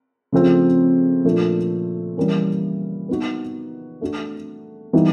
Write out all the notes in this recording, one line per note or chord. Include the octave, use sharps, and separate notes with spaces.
C#3 F3 A3 C4
A#2 F3 A3 D4 F4
E3 G3 A#3 C#4
B3 D#4 F#4
A3 D4 F#4
E3 G3 B3 D#4 F#4